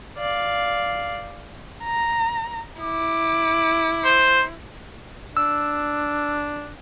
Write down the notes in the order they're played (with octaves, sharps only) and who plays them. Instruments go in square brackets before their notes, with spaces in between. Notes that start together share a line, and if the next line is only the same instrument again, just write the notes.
[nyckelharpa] D5 F5
[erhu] A#5
[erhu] E4 [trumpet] D6
[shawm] C5
[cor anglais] D4 [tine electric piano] E6